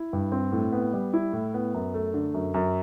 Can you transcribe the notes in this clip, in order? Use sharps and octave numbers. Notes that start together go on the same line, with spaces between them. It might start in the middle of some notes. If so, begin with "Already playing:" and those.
Already playing: E4
G2
C4
A2
B3
G3
E4
A2
B3
F#2
A3
D3
F#2
F#2